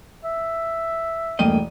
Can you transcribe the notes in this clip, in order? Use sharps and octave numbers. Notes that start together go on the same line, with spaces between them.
E5
E1 G2 A3 A#3 D#5 G5 D#7